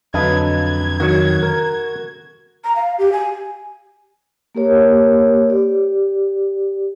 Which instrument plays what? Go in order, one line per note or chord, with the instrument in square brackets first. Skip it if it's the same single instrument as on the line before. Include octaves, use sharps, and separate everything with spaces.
[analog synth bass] F2 [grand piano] D3 F#3 B4 [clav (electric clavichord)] D#5 F5 A5 [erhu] G#6
[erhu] G#6
[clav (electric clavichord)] D#3 F#3 [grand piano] F#4
[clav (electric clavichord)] A#4
[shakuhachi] A#5
F5
G4
G#5
[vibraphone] A#3 G4 A#4 C#5
G4 D5